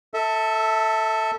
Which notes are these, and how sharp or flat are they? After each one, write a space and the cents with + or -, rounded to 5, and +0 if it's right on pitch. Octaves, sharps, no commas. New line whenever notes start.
A4 +10 E5 -20